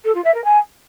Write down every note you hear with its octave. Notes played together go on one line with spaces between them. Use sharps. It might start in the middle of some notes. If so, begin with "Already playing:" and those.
A4
F4
E5
A#4
G#5